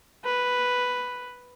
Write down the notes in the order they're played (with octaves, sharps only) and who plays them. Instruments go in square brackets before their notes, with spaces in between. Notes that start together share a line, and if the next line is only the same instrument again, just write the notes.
[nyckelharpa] B4